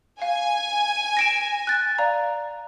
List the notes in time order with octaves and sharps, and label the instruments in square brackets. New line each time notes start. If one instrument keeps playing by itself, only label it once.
[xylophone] F5 [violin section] G#5
[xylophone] A#6 D7 E7
F#6 A6
D5 F5 A#5